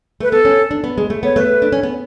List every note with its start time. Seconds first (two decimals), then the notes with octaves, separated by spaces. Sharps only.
0.20 A3 B4
0.32 B3 A4
0.45 C#4
0.71 D4
0.84 B3
0.98 G#3
1.10 A3
1.23 B3 C#5
1.36 A3 B4
1.62 D4
1.72 C#4
1.83 B3